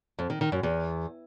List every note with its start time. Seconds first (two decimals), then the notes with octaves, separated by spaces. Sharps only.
0.19 F2
0.30 D#3
0.41 D#3
0.52 F#2
0.63 E2